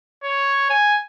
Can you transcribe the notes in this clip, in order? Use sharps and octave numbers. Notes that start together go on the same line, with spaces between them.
C#5
G#5